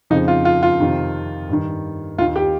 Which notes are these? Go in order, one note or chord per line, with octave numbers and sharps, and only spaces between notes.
F2 C#3 F3 D#4
F4
F4
F4
F2 C3 D#3
G2 D#3
D#2 D#3 F4
G4